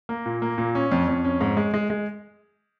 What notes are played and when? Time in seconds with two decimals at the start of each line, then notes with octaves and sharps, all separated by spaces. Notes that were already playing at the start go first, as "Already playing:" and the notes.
0.09 A#3
0.26 A#2
0.42 A#3
0.58 A#2
0.75 C#4
0.92 F2
1.08 F2
1.24 C#4
1.41 G#2
1.57 G#3
1.74 G#3
1.90 G#3